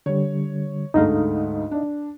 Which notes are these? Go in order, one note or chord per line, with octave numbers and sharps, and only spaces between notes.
D3 G3 C#5
D2 G#2 A3 D#4 D#5 F5
D4